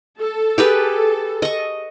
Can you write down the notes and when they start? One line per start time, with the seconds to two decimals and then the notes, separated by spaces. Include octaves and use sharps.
0.20 A4
0.58 G4 G#4 B4
1.42 D#5 C#6